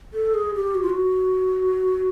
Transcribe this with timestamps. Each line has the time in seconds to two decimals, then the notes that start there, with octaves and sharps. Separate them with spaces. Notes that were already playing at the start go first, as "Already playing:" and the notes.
0.13 A4
0.34 G#4
0.55 G4
0.75 F#4
0.83 F4
0.89 F#4